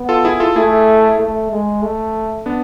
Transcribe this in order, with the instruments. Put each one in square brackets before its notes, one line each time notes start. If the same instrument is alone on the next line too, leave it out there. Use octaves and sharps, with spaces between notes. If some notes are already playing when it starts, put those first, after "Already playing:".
Already playing: [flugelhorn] B3
[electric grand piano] F4 A4
E4 G#4
F4 A4
[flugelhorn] A3 [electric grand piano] E4 G#4
[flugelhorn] A3
G#3
A3
[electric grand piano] B3 D4